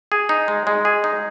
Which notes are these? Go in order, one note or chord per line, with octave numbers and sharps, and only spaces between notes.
G#4
D#4
G#3
G#3
G#4
D#4